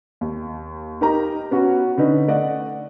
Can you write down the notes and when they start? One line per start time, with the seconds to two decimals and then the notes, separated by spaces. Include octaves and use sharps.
0.21 D#2
1.01 D#4 G4 A#4 D#5 A#5
1.51 B3 C#4 F#4
1.98 D3 C#4 D#4 B4
2.28 A3 D5 D#5 F#5